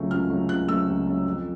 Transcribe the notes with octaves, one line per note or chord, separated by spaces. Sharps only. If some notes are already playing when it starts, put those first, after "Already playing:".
Already playing: C#2 C#3 F#3 A3
C#2 F6
C#3 F#3 A3
C#2 F#6
C#3 F#3 A3 E6
C#2
C#3 F#3 A3
F2